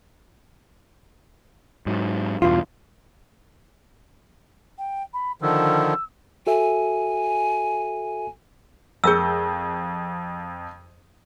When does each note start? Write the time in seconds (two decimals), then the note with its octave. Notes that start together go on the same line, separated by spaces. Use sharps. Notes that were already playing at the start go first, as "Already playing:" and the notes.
1.86 G#2 F#3
2.42 E2 G2 B2 F4
4.78 G5
5.13 B5
5.42 D3 D#3 F3 E6
6.47 F#4 A4 E5 G#5
9.04 F2 G#4 A#4 E6 G6